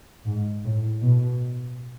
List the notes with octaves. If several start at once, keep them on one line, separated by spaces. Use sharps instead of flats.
G#2
A2
B2